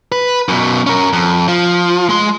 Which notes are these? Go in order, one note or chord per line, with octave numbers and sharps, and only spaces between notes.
B4
F#2 B2
C#4 A#4
F2
F3
G#3 C6